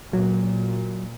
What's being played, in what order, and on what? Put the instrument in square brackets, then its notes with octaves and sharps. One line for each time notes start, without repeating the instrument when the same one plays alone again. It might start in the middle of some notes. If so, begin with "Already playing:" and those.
[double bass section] A#2 [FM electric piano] F#3